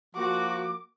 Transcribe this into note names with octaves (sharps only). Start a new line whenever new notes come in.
F3 A#3 F#4 D6